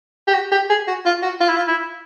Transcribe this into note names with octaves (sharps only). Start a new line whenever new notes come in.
G4
F#4
G4
G#4
F#4
F4
F#4
F4
E4
F4
E4